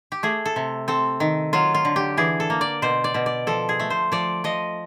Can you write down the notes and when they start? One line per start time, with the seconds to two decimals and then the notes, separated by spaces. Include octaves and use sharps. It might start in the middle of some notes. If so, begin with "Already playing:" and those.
0.12 G4
0.23 A3 G#4
0.46 A4
0.56 C3
0.88 C4 A4
1.20 D#3
1.53 F#3 F4
1.74 F4
1.85 D3
1.96 G4
2.17 E3 G#4
2.40 A4
2.50 A#3
2.61 D5
2.82 B2 C5
3.04 D5
3.14 B2
3.26 D5
3.47 F3 A4
3.69 G#4
3.79 A3
3.90 C5
4.12 F3 D5
4.44 F3 D#5